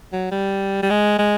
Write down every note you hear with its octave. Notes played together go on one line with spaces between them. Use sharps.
F#3
G3
G3
G#3
G#3